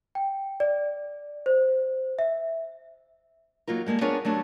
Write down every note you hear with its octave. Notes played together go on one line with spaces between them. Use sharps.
G5
D5
C5
E5
F#3 A#3 D#4 F4 A#4
G3 G#3 A#3 A4
B3 D4 F4 G#4 A#4 C#5
F#3 A3 D4 G4